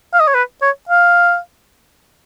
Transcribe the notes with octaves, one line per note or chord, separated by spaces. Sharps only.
F5
D#5
C#5
B4
C#5
F5